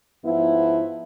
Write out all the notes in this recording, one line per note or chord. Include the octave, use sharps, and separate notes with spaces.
G#2 F3 B3 E4